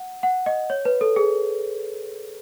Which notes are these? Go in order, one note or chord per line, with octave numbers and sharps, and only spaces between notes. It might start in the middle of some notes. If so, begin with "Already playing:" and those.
Already playing: F#5
F#5
D#5
C#5
B4
A4
G#4